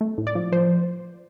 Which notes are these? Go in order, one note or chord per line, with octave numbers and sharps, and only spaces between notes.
A3
A2
D5
F3
F3 C5